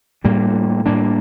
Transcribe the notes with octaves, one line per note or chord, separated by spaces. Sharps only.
A2 G3 A#3 D4
A2 G3 A#3 D4